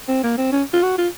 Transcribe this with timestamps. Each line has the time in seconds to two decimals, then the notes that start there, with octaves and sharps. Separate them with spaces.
0.08 C4
0.23 A#3
0.38 C4
0.52 C#4
0.73 F4
0.83 F#4
0.98 F4